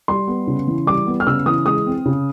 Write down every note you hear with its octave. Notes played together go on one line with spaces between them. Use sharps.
G3 C6
B3
C#3
E3
G3 D6
B3
F6
C#3 E6
E3 D#6
G#3 D#6
C4
C#3